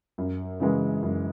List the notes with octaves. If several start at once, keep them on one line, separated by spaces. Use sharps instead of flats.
F#2
C#3 E3 G#3
F#2